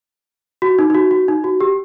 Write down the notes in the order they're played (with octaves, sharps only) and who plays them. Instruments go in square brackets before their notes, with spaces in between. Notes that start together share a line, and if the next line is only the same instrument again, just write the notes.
[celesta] F#4
D#4
D#4
F#4
F#4
D#4
F#4
G4